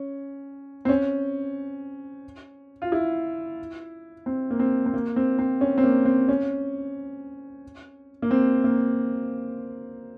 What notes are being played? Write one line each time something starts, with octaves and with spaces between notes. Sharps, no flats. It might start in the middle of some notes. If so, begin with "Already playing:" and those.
Already playing: C#4
C4
C#4
F4
E4
C4
A#3
C4
C4
A#3
C4
C4
C#4
C4
A#3
C4
C#4
A#3
C4
A#3